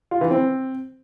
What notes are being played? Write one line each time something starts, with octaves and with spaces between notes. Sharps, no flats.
F4
E3
C4